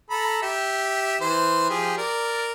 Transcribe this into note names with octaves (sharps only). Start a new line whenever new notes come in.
A4 A#5 B5
G4 E5
E3 C5
F3 G4 G#4
A#4 D5